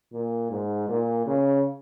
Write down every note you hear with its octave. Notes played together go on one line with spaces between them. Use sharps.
A#2
G#2
A#2
C#3